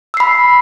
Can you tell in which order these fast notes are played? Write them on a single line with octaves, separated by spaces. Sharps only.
E6 C7 B5